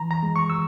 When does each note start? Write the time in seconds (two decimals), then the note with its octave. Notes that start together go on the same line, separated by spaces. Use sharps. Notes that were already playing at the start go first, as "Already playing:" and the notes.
Already playing: E3 A#5
0.11 A#5
0.23 G#3
0.36 C#6
0.50 E6